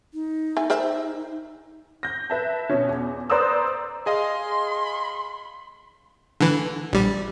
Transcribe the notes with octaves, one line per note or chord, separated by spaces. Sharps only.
D#4
E4 G#5
A#4 C5 E5
G6 A#6
B4 E5 A5
B2 C#4
E2
B4 C5 D5 A#5 D#6 E6
G#4 D#5 F5 C6
D3 E3
A#1 G3